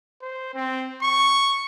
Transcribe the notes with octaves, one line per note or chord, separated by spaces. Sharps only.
C5
C4
C#6